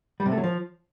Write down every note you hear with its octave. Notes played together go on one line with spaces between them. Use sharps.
G3
C3
A3
F#3
F3